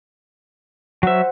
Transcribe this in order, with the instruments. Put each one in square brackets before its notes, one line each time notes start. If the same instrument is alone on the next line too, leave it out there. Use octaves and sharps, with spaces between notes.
[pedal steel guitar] F#3 E5 [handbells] C5 F#5